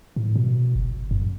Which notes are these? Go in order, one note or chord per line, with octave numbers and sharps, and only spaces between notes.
A2
B2
F#1
F#2